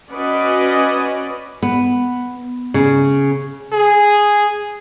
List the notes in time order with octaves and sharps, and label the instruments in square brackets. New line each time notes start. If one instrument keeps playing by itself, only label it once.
[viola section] C#4 F#4 B4 D5 D#5
[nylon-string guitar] B3
C#3
[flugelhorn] G#4